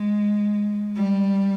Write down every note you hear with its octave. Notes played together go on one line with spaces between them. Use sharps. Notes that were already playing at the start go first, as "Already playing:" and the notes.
Already playing: G#3
G3